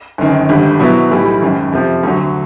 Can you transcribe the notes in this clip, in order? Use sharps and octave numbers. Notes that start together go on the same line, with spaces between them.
G1 F#2 D#3
G#1 G2 D3 G3
B2 F#3 B3 E4
B1 A2 E3 G3
G#1 F#2 D#3
F2 C3 F3
D2 D3 F#3